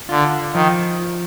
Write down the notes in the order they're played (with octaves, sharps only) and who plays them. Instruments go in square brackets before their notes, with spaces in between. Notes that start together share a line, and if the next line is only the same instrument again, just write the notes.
[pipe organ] D3 [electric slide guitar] F4
[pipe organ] D#3 [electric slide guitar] F3